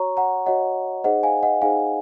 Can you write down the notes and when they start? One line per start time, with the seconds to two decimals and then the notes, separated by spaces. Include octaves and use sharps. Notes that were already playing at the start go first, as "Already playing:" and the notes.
Already playing: F#4 C#5 A#5 C#6
0.17 F#5 A#5
0.46 F#4 C#5 D#5 F#5
1.04 D#4 G#4 C5 D#5 F#5
1.23 F5 G#5
1.43 D#5 F#5
1.62 D#4 G#4 C5 F5 G#5